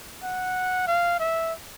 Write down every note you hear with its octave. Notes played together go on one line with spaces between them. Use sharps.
F#5
F5
E5